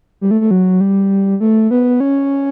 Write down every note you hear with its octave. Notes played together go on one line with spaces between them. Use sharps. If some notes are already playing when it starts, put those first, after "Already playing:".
G3
A3
A3
F#3
G3
A3
B3
C#4